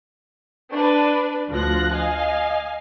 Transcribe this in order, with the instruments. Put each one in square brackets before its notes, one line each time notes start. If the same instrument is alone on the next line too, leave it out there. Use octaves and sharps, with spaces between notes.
[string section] D4 B4
D2 F3 F#6 A#6
D#5 F5 G#5